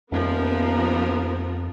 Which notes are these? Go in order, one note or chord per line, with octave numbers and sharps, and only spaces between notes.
D#1 F2 F3 B3 A#4